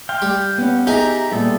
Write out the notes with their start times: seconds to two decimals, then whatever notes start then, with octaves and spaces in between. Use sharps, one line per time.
0.09 F5 G5 C6
0.22 G3
0.58 B3 C#4
0.87 D#4 G4 G#4 E5 G5 A#5
1.32 A#2 G3 B3 A4 E5